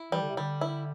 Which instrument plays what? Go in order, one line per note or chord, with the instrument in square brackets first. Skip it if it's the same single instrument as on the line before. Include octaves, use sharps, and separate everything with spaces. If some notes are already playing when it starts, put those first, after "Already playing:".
Already playing: [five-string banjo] E4
[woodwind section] E3 [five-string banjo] G3
[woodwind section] D3
C3
[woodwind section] D3 [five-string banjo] G3
[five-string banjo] E4